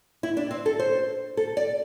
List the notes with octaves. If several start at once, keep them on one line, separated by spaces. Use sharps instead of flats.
E4
D4
C4
A4
C5
A4
D5